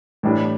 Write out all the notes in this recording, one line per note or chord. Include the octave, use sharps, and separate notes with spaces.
A2 E3 G3 D4